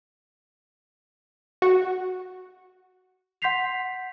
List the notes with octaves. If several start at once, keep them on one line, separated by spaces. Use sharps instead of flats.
F#4
F#5 C6 G6 B6 C7 F7